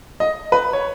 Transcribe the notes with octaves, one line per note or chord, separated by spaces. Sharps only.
D#5
B4
C#5